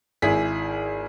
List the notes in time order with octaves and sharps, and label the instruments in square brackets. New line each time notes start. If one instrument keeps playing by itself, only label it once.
[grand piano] G#1 E4 G#4 B6